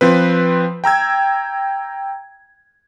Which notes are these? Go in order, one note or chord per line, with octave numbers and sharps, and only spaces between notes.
F3 C4 B4
G5 A#5 E6 G#6